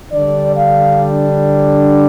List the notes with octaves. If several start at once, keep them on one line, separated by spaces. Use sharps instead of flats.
D3 G3 D4 D5
F5